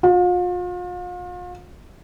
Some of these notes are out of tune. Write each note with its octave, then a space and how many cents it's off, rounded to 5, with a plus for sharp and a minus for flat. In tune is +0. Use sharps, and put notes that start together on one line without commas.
F4 +40